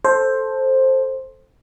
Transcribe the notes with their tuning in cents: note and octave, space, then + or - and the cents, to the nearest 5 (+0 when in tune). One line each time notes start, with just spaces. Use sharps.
A4 +0 C5 +10